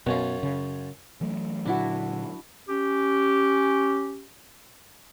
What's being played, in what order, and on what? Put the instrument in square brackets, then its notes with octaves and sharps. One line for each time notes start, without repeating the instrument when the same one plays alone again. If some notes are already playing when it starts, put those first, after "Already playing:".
[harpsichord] F#2 C#4 F4 [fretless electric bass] B2
[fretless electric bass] C#3
[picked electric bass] E3 F#3 A3
[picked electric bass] A#2 D3 F#3 [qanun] D4 E4 F#4
[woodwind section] C#4 G4